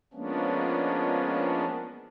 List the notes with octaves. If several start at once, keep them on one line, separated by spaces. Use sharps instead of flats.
F3 G#3 A#3 B3 C#4 D4